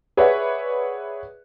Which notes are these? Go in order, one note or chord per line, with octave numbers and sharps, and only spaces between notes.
G#4 B4 C#5 D5 E5 F#5